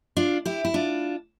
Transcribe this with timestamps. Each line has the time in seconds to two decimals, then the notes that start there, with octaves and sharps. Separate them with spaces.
0.17 D4 F4
0.45 E4 G4
0.65 E4
0.74 D4 F4